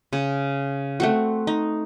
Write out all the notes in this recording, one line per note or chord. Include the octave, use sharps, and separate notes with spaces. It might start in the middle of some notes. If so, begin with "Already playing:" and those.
C#3
A3 C4 F#4
D#4